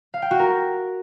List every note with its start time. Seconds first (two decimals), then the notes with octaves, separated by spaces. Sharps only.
0.14 F5
0.22 G5
0.31 F#4
0.39 A#4